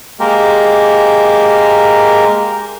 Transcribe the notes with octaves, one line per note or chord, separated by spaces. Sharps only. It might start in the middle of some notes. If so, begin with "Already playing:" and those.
G#3 A#3 G4 A#4